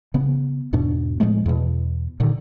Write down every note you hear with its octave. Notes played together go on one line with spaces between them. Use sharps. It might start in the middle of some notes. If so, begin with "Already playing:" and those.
C#3 B3
E2 G#2 B2 D4
A2 F3 G#3 A3
E2 B2
A#2 D3 D#3